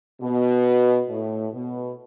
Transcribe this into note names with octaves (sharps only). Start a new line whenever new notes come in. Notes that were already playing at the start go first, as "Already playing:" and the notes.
B2
A2
B2